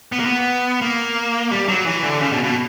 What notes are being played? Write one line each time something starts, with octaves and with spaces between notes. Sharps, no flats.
B3
A#3
B3
A#3
G3
F#3
E3
D3
C#3
B2
B2